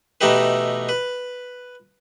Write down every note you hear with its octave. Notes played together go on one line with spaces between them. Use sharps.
B2 E3 A3 D#4 G4 B4
B4